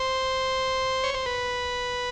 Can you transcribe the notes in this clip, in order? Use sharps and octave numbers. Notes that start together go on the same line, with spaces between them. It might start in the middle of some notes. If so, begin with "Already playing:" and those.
Already playing: C5
C#5
C5
B4